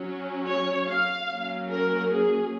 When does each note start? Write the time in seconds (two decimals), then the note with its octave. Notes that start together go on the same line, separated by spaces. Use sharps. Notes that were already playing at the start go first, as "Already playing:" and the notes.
Already playing: F#3 C#4
0.46 C#5
0.87 F5
1.29 F#3 A#3 C#4
1.70 A#4
2.10 G#4